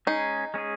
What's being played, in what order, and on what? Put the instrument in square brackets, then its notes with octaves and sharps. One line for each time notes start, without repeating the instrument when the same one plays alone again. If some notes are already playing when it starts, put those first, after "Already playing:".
[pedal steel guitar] G#3 C#4 G#4 [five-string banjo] D#4
[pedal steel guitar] G#3 C#4 G#4